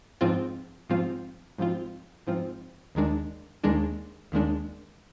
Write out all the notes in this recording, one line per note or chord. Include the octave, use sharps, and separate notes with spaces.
G#2 F3 C4 F4
G#2 F3 C4 F4
G#2 F3 C4 F4
G#2 F3 C4 F4
D#2 D#3 G#3 D4
D#2 D#3 G#3 D4
D#2 D#3 G#3 D4